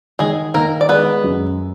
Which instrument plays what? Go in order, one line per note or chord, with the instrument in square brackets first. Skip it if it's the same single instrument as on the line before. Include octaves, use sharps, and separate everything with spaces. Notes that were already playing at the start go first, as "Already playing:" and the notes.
[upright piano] D#3 [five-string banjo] G#3 G#4
[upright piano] D#3 [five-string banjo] A#3 A#4
[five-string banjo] D5
[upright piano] G#3 [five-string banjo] B3 B4
[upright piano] F#2